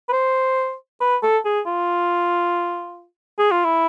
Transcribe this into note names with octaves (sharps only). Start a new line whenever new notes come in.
B4
C5
B4
A4
G#4
F4
G#4
F4
E4